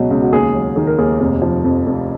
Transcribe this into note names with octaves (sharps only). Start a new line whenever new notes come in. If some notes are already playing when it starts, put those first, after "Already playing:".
Already playing: C#2 B2 F#3 D#5
C#2
F#4
D#2 G#4
F#3
D#3 G#4
A#4
D#2 G#4
F1
F3
F2
F1